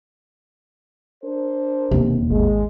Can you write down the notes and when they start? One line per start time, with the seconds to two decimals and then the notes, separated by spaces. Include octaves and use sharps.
1.24 D4 A#4 C5
1.91 E1 D#2 C3
2.31 G#1 G#3